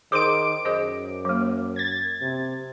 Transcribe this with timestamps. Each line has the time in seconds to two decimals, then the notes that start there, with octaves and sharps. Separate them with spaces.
0.12 D#3 G#4 C5 C6 D6 D7
0.65 F#2 G#4 C5 D#5
1.25 F#3 A#3
1.76 G#6 A6
2.21 C3